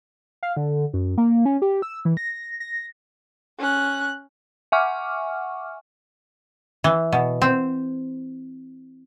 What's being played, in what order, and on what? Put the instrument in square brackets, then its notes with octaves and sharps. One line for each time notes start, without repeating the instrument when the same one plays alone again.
[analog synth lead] F5
D3
F#2
A#3
C#4
G4
E6
E3
A#6
A#6
[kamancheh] C#4 F#6
[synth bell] E5 F#5 G#5 C#6 D6 F6
[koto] E3
B2
C4